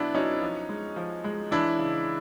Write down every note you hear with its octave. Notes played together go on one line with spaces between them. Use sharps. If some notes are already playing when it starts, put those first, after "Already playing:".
Already playing: B2 F#3 B3 D4 E4
F#3 C#4 D#4
F3
G#3
F3
G#3
E3 D4 E4
C#3